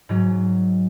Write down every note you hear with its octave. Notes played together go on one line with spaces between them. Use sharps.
G#2 F#3